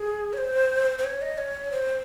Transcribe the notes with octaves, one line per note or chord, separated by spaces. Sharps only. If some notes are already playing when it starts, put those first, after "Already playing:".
Already playing: G#4
C#5
C5
C5
C#5
D#5
C#5
C5